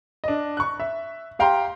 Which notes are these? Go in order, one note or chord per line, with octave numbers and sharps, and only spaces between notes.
D4 D#5
C#6 F#6
E5
G4 F5 G5 A#5 C6